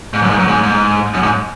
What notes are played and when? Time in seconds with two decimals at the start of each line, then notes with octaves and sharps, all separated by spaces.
0.13 G#2
0.23 F#2
0.30 G#2
0.39 F#2
0.48 G#2
0.63 G#2
1.14 F#2
1.23 G#2